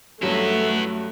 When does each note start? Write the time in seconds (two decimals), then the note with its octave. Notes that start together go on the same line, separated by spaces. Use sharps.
0.22 G2 F#3 A3 B3 C#4 E4